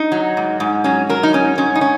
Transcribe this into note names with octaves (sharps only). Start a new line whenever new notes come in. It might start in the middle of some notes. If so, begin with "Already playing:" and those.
Already playing: D#4
F#3
G#2
G#2
F#3 C#4
F#3 A#4
D#4
G#2 C#4
G#2 C#4
D#4
C#4